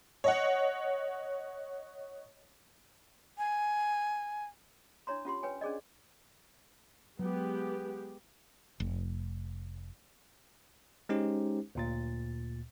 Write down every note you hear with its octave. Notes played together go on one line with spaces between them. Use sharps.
C#5 D#5 F#5
G#5
D4 E4 C#5 A#5 C6
C#4 F4 G4 C6
B4 C#5 G5 G#5
C#4 D4 G#4 D5 D#5
F#3 G#3 B3 G4
F1
G#3 C#4 D#4 G4 C5
D2 A#2 A6